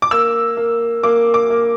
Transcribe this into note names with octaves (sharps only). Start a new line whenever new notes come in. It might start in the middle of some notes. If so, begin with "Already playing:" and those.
D6
A#3 E6
A#3
A#3 D6
D6
A#3